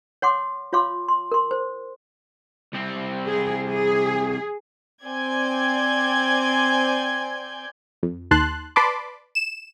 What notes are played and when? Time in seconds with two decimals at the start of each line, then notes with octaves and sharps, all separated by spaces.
0.22 C#5 F#5 C6 D6
0.73 F4 C#5 F5 C6 D6
1.08 C6
1.32 A#4 C6
1.51 C5
2.74 C2 C4
3.28 G#4
3.68 G#4
5.04 C4 D5 G#5 G6 G#6
8.03 F2
8.31 D#2 D#3 A5 C6 F#6
8.76 B4 D5 A5 B5 C6 D6
9.35 E7